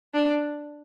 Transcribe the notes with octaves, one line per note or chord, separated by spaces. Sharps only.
D4